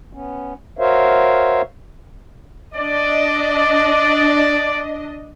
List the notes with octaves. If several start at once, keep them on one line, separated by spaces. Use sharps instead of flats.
B3 C#4
F#4 A#4 C5 C#5 E5 F5
D4 D5 D#5